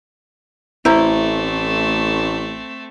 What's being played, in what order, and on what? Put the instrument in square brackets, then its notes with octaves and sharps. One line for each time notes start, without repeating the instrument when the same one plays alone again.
[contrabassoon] A1 [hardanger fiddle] A3 C4 [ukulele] E4 C5 A#5